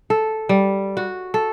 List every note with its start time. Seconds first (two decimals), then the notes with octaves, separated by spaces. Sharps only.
0.10 A4
0.49 G3
0.97 F#4
1.34 A4